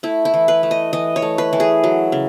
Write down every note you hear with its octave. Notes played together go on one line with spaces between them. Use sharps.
A3 E4
E4
E3
B4
A3
D#5
E3 D#5
C#5
A3
B4
E3
G#4
F#3
C#3